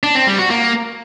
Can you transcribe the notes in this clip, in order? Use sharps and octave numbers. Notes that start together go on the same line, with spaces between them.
D4
C4
G3
F#4
A#3